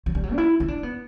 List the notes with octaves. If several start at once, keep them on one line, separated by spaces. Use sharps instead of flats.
F#3
G3
F#3
D4
E4
E4
D4
B3